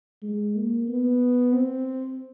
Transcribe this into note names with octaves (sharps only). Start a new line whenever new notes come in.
G#3
A#3
B3
C4